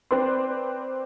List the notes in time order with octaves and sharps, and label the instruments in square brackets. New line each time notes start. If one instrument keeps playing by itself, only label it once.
[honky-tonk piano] C4 B4 C5 D5 C6